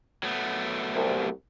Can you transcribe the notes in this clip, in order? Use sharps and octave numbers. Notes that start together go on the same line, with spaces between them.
F#3 A3 B3
C2